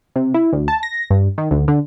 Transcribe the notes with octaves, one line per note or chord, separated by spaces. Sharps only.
C3
E4
D2
A5
A#6
G2
D#3
D2
D3